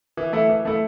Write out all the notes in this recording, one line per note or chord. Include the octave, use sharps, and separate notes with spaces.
E3
A3 E4
E3
A3 E4